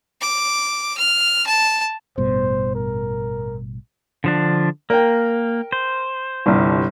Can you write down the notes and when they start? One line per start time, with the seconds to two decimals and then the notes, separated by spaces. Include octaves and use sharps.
0.21 D6
0.97 F6
1.47 A5
2.18 A1 G2 B2 C5
2.75 A#4
4.24 D3 F3 D4
4.90 A#3 A#4 G5
5.72 C5
6.46 G1 C2